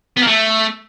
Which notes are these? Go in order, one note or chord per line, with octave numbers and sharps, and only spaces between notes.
B3
A#3
A3